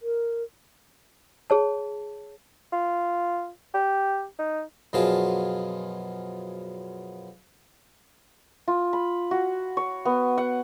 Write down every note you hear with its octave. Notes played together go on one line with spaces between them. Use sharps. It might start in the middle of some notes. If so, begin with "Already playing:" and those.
A#4
G#4 C#5 A5
F4
G4
D#4
F#2 B2 F3 F4 G#4 A5
F4
B5
F#4
C#5
B3
F#5